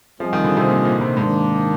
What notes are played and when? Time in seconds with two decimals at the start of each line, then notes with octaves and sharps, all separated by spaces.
0.20 F3 G3 C4 F4 G#4 D#5
0.33 D#3
0.44 D3
0.57 C3
0.69 A#2
0.85 A#2
1.01 C3
1.17 G#2 D#3 A#3 D4